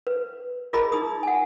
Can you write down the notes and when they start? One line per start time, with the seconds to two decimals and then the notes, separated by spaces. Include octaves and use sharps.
0.07 B4
0.73 F4 G#4 A#4 D#5 A#5 B5
0.92 D#4 G#4 D#6
1.23 F#5 G#5